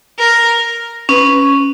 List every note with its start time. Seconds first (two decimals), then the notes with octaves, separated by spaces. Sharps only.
0.19 A#4
1.09 C#4 B4